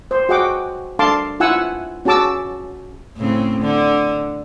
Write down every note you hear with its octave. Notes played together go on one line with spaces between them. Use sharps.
C5
F#4 G#4 D#5 F#5 G5 D6
D4 A4 F5 A5 C6 D6
E4 F4 F#5 G#5 E6
C#4 F#4 G#4 A5 D6 E6
A2 C#3 C4
D3